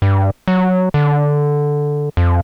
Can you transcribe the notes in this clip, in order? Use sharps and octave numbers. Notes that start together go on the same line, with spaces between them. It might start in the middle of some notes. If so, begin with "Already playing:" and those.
G2
F#3
D3
F2